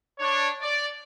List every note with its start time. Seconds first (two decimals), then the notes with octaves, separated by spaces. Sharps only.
0.19 D4 C#5
0.61 D5